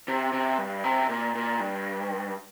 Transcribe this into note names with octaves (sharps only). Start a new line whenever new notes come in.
C3
C3
G2
C3
A#2
A#2
G2